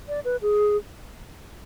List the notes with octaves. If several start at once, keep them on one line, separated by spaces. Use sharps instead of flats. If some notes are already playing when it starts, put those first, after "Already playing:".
D5
B4
G#4